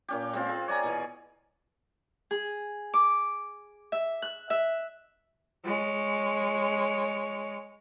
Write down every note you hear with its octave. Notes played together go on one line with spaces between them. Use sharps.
A#2 C#4 G4
G#3 C4 F4
G#3
C#5 D5 G#5 A#5
B2 E3 G#5
G#4
D6
E5
F#6
E5
G#3 C#5